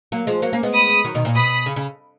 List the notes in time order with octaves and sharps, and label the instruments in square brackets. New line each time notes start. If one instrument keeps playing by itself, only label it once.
[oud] F#3 A#3
F3 G#3
F#3 A#3
A#3 C#4
G#3 B3
[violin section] B5 D#6
[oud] D#3 F#3
B2 D#3
A#2
[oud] B2 [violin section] B5 D#6
[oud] C#3
C#3